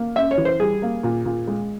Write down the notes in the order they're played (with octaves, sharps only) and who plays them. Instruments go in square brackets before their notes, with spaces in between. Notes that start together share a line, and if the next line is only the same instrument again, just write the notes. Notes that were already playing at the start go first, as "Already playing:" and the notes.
Already playing: [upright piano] A#3
[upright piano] C#4 [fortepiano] E5
[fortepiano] C#5
[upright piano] E3
[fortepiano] C5
[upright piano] G3 [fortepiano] G#4
[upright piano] A#3
A#2
A#2
G#3